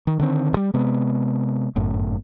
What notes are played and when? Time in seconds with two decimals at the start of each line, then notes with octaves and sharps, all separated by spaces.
0.07 D#3
0.19 D3 D#3 C4
0.53 D2 G3
0.74 C3 G#3 B3
1.76 G1 F#2 A2